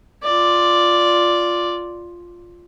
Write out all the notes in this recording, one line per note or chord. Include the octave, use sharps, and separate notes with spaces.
F4 D5